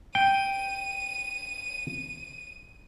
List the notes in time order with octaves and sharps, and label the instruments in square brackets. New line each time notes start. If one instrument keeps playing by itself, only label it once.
[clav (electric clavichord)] G5 [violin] D#7